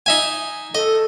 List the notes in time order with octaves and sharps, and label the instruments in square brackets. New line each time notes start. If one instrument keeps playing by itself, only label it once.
[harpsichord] D#4 E5 G#5
[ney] A4 [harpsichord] D#5